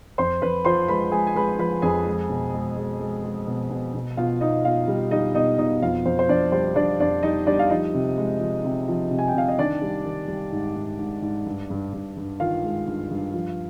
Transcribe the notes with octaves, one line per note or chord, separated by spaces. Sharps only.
F2 C5 C6
F2 B4 B5
F3 C5 C6
G#3 B4 B5
G#3 G#4 G#5
G#5
G#3 B4 B5
F3 B4 B5
F2 G#4 G#5
G#3
B2
G#3
G#3
G#3
G#3
B2
B2
B2
B2 F4 F5
B2 D#4 D#5
B2 F4 F5
G3
G3 D#4 D#5
B2 D#4 D#5
B2 D#4 D#5
F2 F4 F5
F2 C5
C5
F2 D4 D5
G3 C5
G3 D4 D5
F2 D4 D5
G3 D#4 D#5
G3 D4 D5
F5
F3 D#4 D#5
C3
G#3
F3
C3
F3
C3
G#5
G5
C3 F5
D#5
D#3 D4 D5
G3
D#3
G3
G#2
G#2
G#2
G#2
G2
G2
G2
G2
D#3 F4 F5
G#3
G2
G2
F3